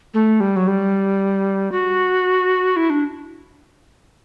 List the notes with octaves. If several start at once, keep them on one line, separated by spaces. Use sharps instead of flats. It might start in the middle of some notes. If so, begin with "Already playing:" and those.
A3
G3
F#3
G3
F#4
E4
D4